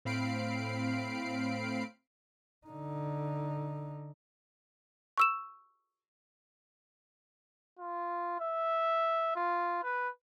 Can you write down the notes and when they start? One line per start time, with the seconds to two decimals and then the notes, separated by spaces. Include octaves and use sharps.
0.05 A2 C4 F5 B5 C7 D7
2.67 D3 D#4
5.18 C#6 E6 E7
7.79 F4
8.40 E5
9.36 F4
9.83 B4